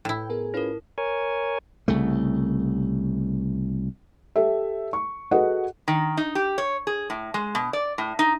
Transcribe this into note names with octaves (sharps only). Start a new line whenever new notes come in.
A2 E4 G5
B3 G#4 A#4
C#4 E4 F4 A#4 B4
A#4 C#5 G#5
C2 C#3 A3
G4 A4 E5
C#6
F#4 G#4 A4 B4 D#5 F#5
D#3
D#4
G4
C#5
G#4
A2
G#3
B2
D5
A2
D#4